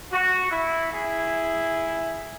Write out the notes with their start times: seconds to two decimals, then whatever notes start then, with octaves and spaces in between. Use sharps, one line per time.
0.12 F#4
0.51 E4
0.92 E4 G#4